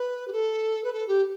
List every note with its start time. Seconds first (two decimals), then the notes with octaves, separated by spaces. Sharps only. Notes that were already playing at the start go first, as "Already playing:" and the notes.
Already playing: B4
0.27 G4
0.32 A4
0.84 B4
0.93 A4
1.07 G4